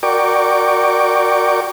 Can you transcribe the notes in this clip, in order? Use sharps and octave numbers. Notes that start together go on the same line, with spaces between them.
F#4 A#4 D5 G5 C#6 D6